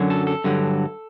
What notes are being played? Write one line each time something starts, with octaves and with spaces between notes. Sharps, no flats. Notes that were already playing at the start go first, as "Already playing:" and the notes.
Already playing: F#2 D3 F#3
A4
A4
G2 D3 F#3